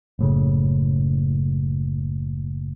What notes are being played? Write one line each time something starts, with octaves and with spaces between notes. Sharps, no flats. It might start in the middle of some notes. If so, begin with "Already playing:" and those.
F#1 A2 C#3